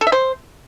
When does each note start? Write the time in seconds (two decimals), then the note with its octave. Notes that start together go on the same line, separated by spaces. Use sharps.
0.01 A4
0.07 E5
0.12 C5